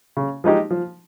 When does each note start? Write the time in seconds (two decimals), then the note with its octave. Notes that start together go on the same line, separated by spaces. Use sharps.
0.17 C#3
0.44 F3 G#3 D#4 G4
0.71 F3